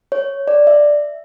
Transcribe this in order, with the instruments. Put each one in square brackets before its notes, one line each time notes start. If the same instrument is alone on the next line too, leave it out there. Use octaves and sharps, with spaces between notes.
[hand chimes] C#5
D5
E5